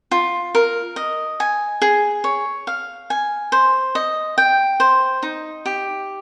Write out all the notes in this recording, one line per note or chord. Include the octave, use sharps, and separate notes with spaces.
F4
A#4
D#5
G#5
G#4
C#5
F5
G#5
C5
D#5
G5
C5
D#4
G4